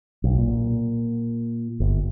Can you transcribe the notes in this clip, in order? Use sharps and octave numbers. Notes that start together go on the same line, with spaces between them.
B1
A#2
G1